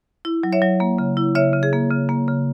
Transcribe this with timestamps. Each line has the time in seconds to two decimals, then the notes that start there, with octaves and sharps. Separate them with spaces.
0.25 E4
0.43 F#3
0.53 C#5 E5
0.62 F#3
0.80 A#3
0.98 C#3
1.17 E4
1.35 C#3 C#5 E5
1.53 C#3
1.63 G#4
1.73 A#3
1.91 C#3
2.09 A#3
2.28 C#3